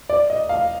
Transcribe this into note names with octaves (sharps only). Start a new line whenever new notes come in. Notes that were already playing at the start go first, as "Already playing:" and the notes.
D5
D#5
F5